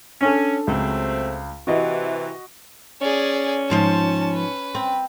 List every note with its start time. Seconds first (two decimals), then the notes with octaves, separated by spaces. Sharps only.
0.21 C#4 D4 A4
0.67 C#2 F#3 A3 C4
1.67 C3 E3 F#4 D#5
3.02 C#4 G#4 D5
3.70 G#2 F3 C5 A5
4.33 B4
4.75 C4